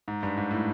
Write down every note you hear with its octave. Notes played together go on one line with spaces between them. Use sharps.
G#2
G2
G#2
A2